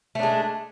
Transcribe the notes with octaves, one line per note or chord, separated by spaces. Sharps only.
G#3 A3 D4